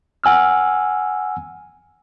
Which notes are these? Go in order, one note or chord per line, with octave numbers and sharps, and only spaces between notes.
F#5 G#5 E6 F6